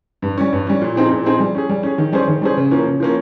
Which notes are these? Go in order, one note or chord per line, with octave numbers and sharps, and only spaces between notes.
G2
G3 C#4
G2
G3 C#4
A#2
F3 C4 D#4 G#4
A#2
F3 C4 D#4 G#4
G3
C#4 G#4
G3
C#4 G#4
D#3
G3 C#4 G#4 C5
D#3
G3 C#4 G#4 C5
C#3
F3 A#3 C#4
C#3
F3 A#3 C#4